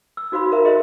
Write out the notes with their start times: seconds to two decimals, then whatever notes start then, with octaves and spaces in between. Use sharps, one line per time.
0.17 E6
0.32 D#4 F#4 C5 F5 B5
0.52 A#4 C5 E5 F5 A#5
0.65 G#4 A#4 C5 D#5 E5 C6